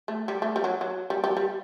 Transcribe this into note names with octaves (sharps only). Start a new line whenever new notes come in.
A3
G3
A3
G3
F#3
F#3
G3
G3
G3